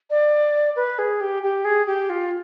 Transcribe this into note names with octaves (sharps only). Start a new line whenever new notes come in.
D5
B4
G#4
G4
G4
G#4
G4
F4